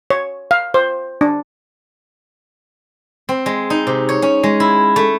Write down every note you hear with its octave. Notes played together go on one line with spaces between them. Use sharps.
C#5
F5
C5
D4
C4
G#3
D#4
C3
C#5
C#4
G#3
E4
A3